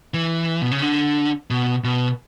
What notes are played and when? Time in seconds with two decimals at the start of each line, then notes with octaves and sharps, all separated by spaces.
0.14 E3
0.62 B2
0.71 C#3
0.82 D3
1.50 B2
1.84 B2